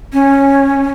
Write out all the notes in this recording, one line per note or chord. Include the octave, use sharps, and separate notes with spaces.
C#4